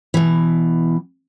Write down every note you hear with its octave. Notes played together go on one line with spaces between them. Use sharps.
B2 E3